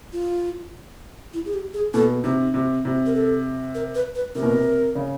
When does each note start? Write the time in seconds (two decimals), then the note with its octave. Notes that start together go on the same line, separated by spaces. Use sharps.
0.13 F4
1.33 E4
1.46 G#4
1.54 G4
1.74 G#4
1.94 B2 A4
2.24 C3 D#4
2.54 C3
2.85 C3
3.06 A#4
3.15 A4
3.75 A#4
3.95 B4
4.15 B4
4.35 C3 A#4
4.43 B2
4.51 C3
4.95 C#3